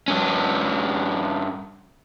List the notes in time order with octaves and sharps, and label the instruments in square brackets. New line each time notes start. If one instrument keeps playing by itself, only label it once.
[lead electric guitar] G2 C#4